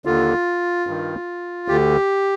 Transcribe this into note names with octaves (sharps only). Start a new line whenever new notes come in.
D#2 D3 F4
G2 D#3
D2 D3 G4